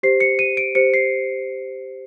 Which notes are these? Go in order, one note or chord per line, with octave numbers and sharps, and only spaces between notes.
G4 C5 C7
C#7
D#7
D7
G4 C5 C#7
C7